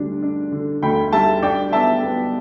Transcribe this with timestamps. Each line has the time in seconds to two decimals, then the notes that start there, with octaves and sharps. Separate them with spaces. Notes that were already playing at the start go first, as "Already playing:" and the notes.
Already playing: D2 D3 G3 D4
0.22 D4
0.52 D3
0.82 D2 G5 B5
1.12 G3 E5 A5
1.42 D4 D5 G5
1.72 B3 E5 A5
2.02 B3